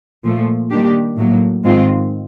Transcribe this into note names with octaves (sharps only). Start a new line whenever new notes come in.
A#2 F3 A3
D#3 G3 A#3 D4 G4
A2 F#3 A#3
G#2 D#3 G#3 C4 F4